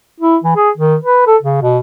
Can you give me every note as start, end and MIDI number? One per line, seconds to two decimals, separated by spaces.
0.20 0.37 64
0.44 0.56 52
0.56 0.70 68
0.78 0.96 51
1.03 1.24 71
1.27 1.37 69
1.43 1.61 49
1.62 1.79 47